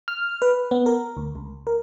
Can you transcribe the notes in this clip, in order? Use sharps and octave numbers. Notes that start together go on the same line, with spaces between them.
F6
B4
B3
A#4
D2
C#2
A#4